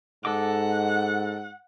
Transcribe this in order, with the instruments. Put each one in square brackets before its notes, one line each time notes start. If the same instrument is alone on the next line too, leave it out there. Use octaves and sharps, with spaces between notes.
[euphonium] G#2 [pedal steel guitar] A4 D#5 D6 [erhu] F#5